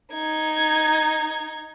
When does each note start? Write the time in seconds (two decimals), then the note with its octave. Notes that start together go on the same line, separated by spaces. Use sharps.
0.13 D#4 G#6